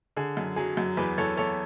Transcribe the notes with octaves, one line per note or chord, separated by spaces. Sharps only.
D3 G#4
F#2
F#3 G#4
F#2
E2 G#4 B4
E2 A4 C#5
E2 A4 C#5